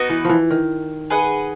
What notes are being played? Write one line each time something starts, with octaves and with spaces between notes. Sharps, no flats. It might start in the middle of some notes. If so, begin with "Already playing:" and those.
Already playing: B3 D#4 F#4 B4
E3
E3 F3
D#3
G#4 B4 D#5 F#5